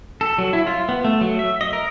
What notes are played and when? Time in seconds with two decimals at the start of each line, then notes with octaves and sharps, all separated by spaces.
0.21 A4
0.38 F#3
0.53 E4
0.67 F4
0.89 B3
1.04 A3
1.21 F#3
1.39 E5
1.61 D#5
1.73 A#4